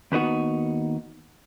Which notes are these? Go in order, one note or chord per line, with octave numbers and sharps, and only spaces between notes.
D#2 B3 D#4 F#4